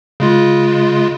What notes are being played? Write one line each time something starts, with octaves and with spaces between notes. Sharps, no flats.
C#3 G#3 F4